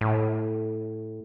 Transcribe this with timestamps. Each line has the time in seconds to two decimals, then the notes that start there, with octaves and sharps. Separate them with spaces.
0.01 A2